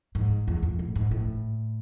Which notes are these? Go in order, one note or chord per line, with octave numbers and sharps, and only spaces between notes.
G#2
E2
F2
A2
G#2
A2